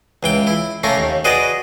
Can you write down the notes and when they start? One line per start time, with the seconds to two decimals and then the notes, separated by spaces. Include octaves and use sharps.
0.23 C#2 E3 G5
0.47 E4
0.83 A3 A#3 C#4 A#4
0.98 D#2
1.25 F#4 G#4 B4 D5 D#5